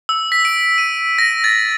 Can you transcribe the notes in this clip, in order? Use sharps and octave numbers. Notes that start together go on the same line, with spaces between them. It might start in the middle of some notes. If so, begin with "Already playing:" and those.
E6
B6
D7
D#7
A#6
A6